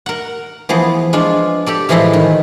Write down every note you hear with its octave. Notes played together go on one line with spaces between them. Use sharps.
A#4 F#5
E3 F3 B3 G#4
G#3 D4 F4
G4 A4 D5
A2 E3 F3 G#3 E4 C6
D#3